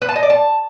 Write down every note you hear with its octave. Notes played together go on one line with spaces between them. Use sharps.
B4
A5
D#5
D5
A5